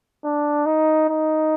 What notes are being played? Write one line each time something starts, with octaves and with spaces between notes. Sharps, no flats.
D4
D#4
D#4